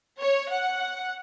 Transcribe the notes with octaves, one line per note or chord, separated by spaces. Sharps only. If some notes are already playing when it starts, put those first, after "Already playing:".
C#5
F#5